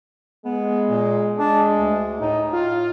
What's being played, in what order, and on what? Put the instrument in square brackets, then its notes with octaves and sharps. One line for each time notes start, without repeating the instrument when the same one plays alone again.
[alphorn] G#3 [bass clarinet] B3
[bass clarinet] A#2
[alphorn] G#3 [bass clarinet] D4
[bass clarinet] D2
[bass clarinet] A2 [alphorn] D#4
[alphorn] F4